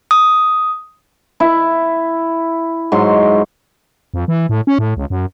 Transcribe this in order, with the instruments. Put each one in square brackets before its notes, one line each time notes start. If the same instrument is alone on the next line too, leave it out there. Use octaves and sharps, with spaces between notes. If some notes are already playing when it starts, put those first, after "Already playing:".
[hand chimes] D#6
[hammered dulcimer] E4
G#2 F#3 C6
[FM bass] F2
E3
A2
C#4
A2
C#2
F#2